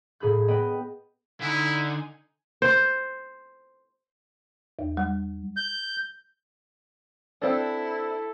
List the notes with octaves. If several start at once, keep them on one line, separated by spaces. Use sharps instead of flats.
A2 G#4 B5 G6
B3 D#5 G5 B5
D3 D#4 E4 G#5
C5
E2
G3
G6
C4 D4 E4 A4